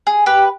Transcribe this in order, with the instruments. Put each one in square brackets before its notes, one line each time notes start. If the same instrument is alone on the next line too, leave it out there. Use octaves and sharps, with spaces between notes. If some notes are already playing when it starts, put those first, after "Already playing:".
[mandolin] G#4
G4 B4